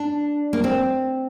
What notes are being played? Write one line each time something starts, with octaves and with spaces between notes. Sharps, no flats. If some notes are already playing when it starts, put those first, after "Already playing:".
Already playing: D4
A#3
C4